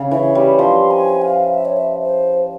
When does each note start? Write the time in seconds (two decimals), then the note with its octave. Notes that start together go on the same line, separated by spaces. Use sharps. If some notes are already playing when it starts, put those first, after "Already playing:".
Already playing: C#3
0.11 E3 C#5
0.35 G3
0.59 F3 C6
0.91 G#5
1.22 F5
1.54 E5
1.65 C#5
1.77 E5
2.01 C5